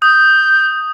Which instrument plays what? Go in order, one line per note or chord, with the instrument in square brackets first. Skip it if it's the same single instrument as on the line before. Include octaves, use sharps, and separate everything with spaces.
[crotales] D#6 [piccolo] G6